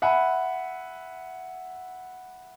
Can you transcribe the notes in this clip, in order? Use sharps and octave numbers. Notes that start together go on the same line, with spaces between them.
E5 F#5 G#5 B5